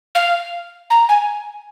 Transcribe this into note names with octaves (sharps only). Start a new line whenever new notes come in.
F5
A#5
G#5